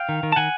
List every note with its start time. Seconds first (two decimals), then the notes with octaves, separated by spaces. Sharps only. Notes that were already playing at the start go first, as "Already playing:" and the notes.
Already playing: F5 G5
0.09 D#3
0.23 D#3
0.32 A5
0.36 D#3 F#5 G#5